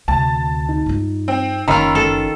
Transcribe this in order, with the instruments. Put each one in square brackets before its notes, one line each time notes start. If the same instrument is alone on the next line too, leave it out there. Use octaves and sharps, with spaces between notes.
[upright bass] D2 C3 [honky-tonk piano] A5
[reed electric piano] D#4
[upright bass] G2 F4
[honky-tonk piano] C4
[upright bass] F#1 [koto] D#3 F4 [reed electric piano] C#4 D#4 [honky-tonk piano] A#5 B5 E6
[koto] A4